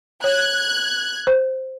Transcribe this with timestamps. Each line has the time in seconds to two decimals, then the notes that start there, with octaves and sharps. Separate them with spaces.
0.24 C#5 F#6 G#6
1.27 C5